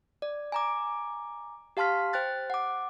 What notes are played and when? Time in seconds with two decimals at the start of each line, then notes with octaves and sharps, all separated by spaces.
0.22 D5
0.52 G#5 A#5 D6
1.77 G4 F5 A5 C6 F6 B6
2.13 C5 G5 F#6 A6
2.50 F#5 D6